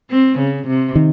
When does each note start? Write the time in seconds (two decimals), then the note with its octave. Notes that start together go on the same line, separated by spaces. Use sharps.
0.10 C4
0.39 C#3
0.67 C3
0.95 D#3